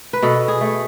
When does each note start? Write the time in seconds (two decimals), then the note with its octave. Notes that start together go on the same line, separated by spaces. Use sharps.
0.13 B4
0.22 B2 A4
0.48 G#4
0.61 A3